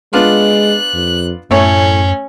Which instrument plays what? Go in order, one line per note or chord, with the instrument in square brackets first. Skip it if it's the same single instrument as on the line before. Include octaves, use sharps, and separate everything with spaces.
[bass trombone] G#3 [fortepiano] B3 D4 F4 [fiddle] F#6
[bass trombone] F2
[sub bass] F#2 [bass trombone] A2 [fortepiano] A3 C#5 [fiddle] C#4